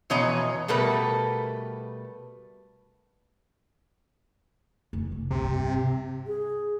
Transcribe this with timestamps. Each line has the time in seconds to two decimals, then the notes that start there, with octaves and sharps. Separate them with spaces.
0.10 F2 B2 E3 C#5 D#5 A#5
0.68 B2 G3 A3 A#4 B4
4.93 F1
5.12 D4
5.31 C#2 C3
5.44 G2
6.27 G#4